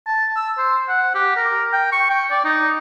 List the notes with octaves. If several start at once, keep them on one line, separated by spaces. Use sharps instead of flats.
A5
E6
C5
F#5
G4
A#4
G5
C#6
G5
D5
D#4